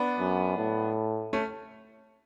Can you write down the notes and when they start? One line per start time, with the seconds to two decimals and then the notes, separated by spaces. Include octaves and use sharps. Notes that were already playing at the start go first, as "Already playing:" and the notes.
Already playing: B3 D4
0.19 F#2
0.57 A2
1.33 A3 C#4